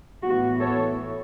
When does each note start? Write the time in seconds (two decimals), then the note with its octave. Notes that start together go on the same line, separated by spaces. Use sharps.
0.22 A2 E3 B3 F#4
0.59 A4 C#5